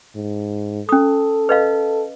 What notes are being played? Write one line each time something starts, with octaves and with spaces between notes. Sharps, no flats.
G#2
C#4 A4 D#6
B4 D#5 F5